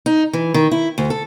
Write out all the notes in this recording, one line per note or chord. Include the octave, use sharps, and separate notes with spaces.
D#4
E3
D#3
E4
D2
A4